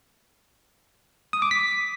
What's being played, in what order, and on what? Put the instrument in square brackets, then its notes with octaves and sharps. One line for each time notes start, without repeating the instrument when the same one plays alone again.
[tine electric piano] D#6
D6
B6